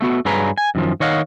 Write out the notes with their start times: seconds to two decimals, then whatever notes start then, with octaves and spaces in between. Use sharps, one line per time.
0.01 A3 B3 F#4
0.25 G2 F#3 G#4 B4 A#5
0.58 G#5
0.75 F#2 D#3 F3
1.00 D#3 C#5 D#5 F5 F#5